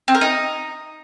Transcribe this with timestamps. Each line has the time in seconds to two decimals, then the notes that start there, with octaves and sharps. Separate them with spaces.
0.08 C4
0.15 A#4
0.21 D#4